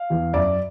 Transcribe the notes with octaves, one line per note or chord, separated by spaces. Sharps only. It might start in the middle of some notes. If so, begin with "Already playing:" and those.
Already playing: F5
E2
F#2 D5 E5